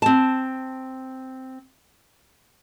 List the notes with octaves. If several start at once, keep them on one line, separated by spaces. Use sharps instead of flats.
C4 A5